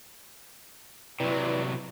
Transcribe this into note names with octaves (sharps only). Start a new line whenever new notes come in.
C3 F#3 E4 B4 D5